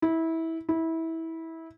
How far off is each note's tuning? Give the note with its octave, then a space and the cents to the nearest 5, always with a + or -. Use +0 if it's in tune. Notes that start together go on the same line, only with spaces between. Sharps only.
E4 -20
E4 -20